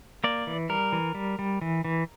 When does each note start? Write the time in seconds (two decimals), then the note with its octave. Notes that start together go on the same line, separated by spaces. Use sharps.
0.24 A#3 D5
0.47 E3
0.69 G3 A#4
0.92 E3
1.15 G3
1.39 G3
1.61 E3
1.85 E3